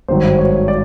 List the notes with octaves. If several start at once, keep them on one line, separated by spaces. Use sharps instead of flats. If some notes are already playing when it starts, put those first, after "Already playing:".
G#1 G2 D#3 F#3 C5
C#5
D5